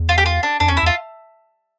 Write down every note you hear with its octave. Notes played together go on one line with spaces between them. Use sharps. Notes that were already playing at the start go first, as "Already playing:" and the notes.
Already playing: E2
F4
G4
F4
D4
F2 D4
C#4
E2
E4
E2
F4